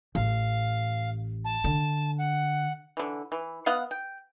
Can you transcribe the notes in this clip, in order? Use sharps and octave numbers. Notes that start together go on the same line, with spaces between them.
A1 F5
A5
D3
F#5
D3 E3
E3
B3 D#5 F5 F#5
G5